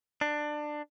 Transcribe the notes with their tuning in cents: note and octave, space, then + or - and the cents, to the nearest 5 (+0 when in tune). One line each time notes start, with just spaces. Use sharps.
D4 +20